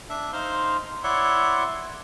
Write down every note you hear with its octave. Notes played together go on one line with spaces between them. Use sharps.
D4 E5
D#4 C5 F5 C6
E4 C#5 D5 E5 F#5 C6